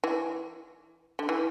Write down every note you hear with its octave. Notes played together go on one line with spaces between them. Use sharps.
E3
D3
E3